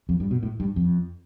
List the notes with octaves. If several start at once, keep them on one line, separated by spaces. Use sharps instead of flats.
F2
G2
B2
A2
G2
F2